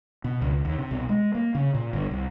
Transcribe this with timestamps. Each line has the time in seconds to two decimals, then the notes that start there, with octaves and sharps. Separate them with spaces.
0.24 B2
0.42 C#2
0.65 D#2
0.79 C3
0.91 B1
1.09 G#3
1.35 A#3
1.55 C#3
1.74 A#2
1.93 G1
2.11 C2